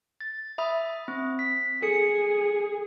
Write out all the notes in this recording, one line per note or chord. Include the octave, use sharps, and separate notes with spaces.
A6
E5 B5 D#6
C4
B6
G#4 A4 C#7